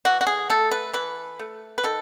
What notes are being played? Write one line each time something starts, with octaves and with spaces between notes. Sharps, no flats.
E3 F#4
F#4
G#4
A3 A4
B4
E3 B4
A3
B4
D#3 A4